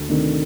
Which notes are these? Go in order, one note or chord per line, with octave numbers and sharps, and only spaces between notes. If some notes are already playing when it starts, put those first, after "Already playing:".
Already playing: D2
C3 D#3 A3 D4